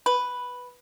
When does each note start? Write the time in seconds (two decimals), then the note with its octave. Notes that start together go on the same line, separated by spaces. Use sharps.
0.06 B4